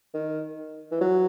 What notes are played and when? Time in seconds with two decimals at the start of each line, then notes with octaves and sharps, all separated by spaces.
0.14 D#3
0.91 E3
1.01 F#3